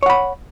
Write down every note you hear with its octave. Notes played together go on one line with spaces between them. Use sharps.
C#5 F#5 B5